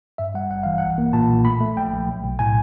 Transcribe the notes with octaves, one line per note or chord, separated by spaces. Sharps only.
G2 E5
G3 F#5
G#1 F#5
E3 F5
B1 F#5
A#3
A#2 A5
B1
A3 B5
A3
A#1 G5
A#1
B1
B1
A2 G#5